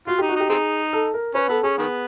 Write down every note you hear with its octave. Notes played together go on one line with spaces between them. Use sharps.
F4 F#4
G4
D#4
F#4
D#4 G4
C4 D#4 G#4
A4
A#4
C#4 B4
B3 A4
C#4 G#4
D#3 B3